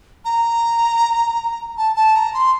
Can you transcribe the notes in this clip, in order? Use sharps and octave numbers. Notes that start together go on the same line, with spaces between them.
A#5
A5
A5
A#5
C6